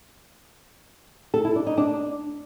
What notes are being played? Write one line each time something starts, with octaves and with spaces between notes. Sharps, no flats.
A4
E4
D4
D#4
D4